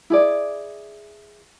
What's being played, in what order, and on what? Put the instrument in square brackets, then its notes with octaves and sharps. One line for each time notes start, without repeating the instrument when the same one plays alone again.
[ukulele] E4 G#4 D5